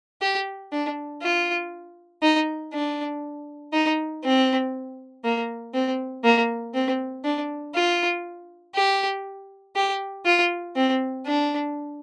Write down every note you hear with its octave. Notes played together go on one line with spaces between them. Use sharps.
G4
D4
F4
D#4
D4
D#4
C4
A#3
C4
A#3
C4
D4
F4
G4
G4
F4
C4
D4